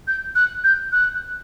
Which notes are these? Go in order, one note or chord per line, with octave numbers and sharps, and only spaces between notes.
G6
F#6
G6
F#6